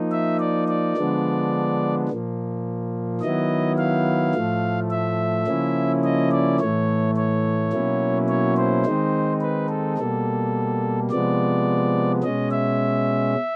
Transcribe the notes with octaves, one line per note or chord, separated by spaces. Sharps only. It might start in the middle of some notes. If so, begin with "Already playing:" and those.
Already playing: F3 A#3 D#4
E5
D5
D5
D3 F3 G#3 B3 D4
A#2 F3 A#3
D#3 F#3 B3 E4 D#5
F5
A2 F3 A3
E5
C#3 F3 A#3 C#4 E4
D#5
D5
A2 E3 A3 C#5
C#5
B2 F#3 A#3 C#4 E4
C#5
C5
D#3 G#3 C4 D#4
B4
A4
B2 G3 A#3 A4
C3 F3 G#3 B3 D5
B2 G#3 C#4 D#5
E5